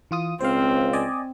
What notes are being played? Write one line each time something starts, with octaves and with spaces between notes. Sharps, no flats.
E3 F4 D#6
C#2 C4 C5 F5
D5 D#5 G#5